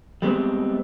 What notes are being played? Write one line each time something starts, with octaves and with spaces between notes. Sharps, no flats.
G3 G#3 B3 C4